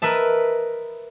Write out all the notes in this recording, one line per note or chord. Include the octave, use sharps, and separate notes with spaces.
A#4 B4 D#5 E5 A5